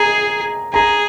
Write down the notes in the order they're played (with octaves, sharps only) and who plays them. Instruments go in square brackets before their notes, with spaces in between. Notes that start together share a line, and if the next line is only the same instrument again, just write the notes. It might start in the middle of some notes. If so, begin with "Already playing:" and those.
Already playing: [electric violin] G#4 [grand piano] A#5
[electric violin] G#4 [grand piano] A#5